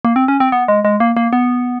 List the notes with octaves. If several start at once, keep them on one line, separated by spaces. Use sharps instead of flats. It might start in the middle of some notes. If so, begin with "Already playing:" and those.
A#3
C4
C#4
C4
B3
G#3
G#3
A#3
A#3
B3